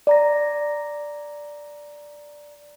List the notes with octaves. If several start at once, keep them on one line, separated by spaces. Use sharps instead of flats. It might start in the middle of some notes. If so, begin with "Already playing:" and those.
D5 A#5 A#6